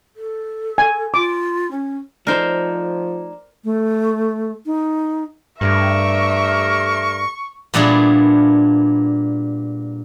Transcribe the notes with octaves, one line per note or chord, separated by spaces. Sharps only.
A4
G#5
F4 D6
C#4
F3 A3 D#4 A4 A#4 C5 D5 A#5
A3
D#4
G2 A3 G4 A#4 E5 C#6
A#2 G3 B3 D4 E4 G#4